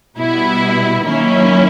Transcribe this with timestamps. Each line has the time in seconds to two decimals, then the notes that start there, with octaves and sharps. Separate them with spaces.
0.16 B2 G3 B3 E4
1.06 D#3 F#3 A#3 C#4 E4